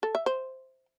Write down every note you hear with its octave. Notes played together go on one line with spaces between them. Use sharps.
A4
E5
C5